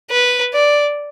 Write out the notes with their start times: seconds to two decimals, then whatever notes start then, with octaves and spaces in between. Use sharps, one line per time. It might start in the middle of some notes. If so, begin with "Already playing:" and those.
0.11 B4
0.54 D5